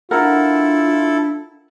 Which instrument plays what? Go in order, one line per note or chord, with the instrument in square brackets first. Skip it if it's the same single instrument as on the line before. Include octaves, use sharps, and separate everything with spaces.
[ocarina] D4 [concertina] E4 A4 [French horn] F4 [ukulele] A#4 F#5